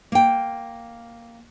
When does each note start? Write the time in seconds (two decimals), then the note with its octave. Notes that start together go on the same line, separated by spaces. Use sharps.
0.12 A#3 G5